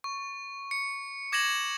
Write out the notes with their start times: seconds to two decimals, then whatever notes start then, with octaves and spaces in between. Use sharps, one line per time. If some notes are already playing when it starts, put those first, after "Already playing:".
0.04 C#6
0.71 C#7
1.32 D6 G#6 A#6 C#7 E7 F#7